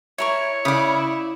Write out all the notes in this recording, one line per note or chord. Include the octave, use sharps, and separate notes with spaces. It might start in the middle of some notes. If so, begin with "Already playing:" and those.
E4 A#4 C#5 C#6
C#3 E4 D5 D#6